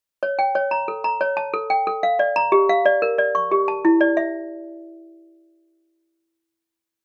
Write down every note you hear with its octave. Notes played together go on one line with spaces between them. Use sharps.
C#5
G5
C#5
A#5
A4
A#5
C#5
A5
A4
G5
A4
F5
D5
A#5
G4
F5
D5
A#4
D5
C#6
G4
A5
E4
D5
E5